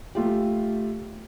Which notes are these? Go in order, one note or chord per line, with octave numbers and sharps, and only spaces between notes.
A3 F4 G4